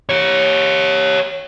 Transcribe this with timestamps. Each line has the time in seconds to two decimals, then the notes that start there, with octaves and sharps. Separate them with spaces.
0.09 G4 C#5